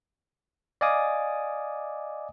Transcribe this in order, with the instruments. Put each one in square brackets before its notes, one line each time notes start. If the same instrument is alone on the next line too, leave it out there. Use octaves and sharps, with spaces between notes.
[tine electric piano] D5 D#5 F5 G#5 D6 D#6